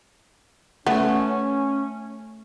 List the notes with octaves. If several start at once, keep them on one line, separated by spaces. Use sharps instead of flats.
A3 B3 C#4